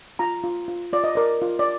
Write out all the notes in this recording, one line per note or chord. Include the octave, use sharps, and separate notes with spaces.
F4 A#5
F4
F4
F4 D5
D#5
A#4 D5
F4
D5